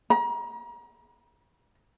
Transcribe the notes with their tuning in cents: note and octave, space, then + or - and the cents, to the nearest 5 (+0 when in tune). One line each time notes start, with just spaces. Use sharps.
A#5 +35